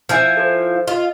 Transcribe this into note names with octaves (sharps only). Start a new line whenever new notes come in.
F3 E4 G#5
A4 C5
F4 D#5